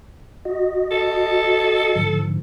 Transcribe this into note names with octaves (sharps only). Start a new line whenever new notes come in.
F#4 D#5
A4
G#2 D3 F3